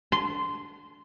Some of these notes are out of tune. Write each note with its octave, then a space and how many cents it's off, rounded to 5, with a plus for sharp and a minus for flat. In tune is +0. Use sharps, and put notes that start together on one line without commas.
C6 -15